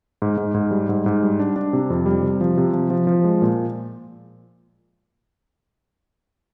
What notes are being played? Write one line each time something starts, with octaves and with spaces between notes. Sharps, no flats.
G#2
G#2
G#2
G3
G#2
G#2
G3
D4
D4
C3
F2
G3
C3
F3
C3
F3
F3
F3
G#3
A#2